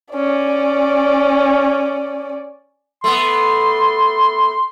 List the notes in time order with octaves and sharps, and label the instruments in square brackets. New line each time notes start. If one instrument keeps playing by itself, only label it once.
[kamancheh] C#4 D5
[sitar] A3 B3 [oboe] C6